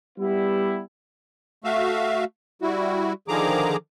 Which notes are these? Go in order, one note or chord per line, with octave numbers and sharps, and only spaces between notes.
G3 B3 E4
A3 F#4 E5 F5
G3 E4 F#4
D3 D#3 F3 G#4 A#5 D6